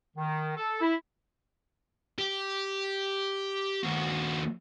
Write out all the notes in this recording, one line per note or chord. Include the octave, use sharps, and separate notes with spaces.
D#3
A4
E4
G4
D#2 F#4